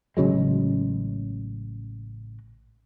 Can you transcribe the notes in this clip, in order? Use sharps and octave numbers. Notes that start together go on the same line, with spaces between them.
A1 C#3 F#3 G#3